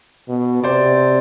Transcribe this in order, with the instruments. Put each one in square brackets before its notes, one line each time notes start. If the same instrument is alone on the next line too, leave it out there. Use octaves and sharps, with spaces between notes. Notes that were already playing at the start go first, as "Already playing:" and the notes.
[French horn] B2
[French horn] C3 [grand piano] C5 D5